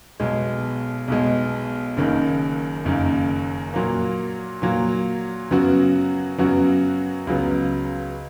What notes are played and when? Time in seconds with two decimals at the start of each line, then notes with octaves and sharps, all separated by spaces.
0.20 B1 B2 G#3
1.08 B1 B2 G#3
1.97 F#1 F#2 D#3 A#3
2.85 F#1 F#2 D#3 A#3
3.74 A#2 F#3 A#3
4.62 A#2 F#3 A#3
5.51 F#2 C#3 F#3 B3 F#4
6.38 F#2 C#3 F#3 B3 F#4
7.27 C#2 C#3 F#3 B3